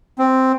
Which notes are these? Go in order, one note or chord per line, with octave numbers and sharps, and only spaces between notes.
C4